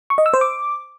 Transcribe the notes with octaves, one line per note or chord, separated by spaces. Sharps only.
C#6
D#5
E6
C5
D6